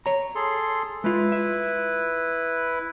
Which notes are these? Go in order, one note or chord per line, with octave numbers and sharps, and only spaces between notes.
C#5 A#5
G#4 A4 C6
G#3 E4 F4 B4
E5